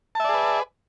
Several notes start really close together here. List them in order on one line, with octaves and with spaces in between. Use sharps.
A5 E5 D5 G#4 B4